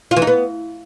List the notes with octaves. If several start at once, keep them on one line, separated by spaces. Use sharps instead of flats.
F4
E3
D#4
B3